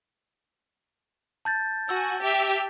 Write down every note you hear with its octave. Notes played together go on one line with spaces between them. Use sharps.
A5 G6 A6
F#4 G#5 E6
G4 E5